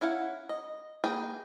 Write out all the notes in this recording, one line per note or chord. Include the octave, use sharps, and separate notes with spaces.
C#4 E4 F5 F#5
D#5
A#3 G#4 B4 G5